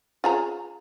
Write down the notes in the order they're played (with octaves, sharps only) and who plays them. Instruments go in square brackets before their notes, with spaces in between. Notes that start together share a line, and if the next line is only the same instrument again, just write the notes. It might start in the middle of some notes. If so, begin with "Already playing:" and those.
[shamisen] F4 G#4 A#5